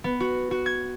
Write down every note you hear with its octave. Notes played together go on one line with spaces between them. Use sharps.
B3
F#4
F#4
G#6